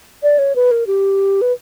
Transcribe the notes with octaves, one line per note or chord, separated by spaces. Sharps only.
D5
C#5
B4
A#4
G4
B4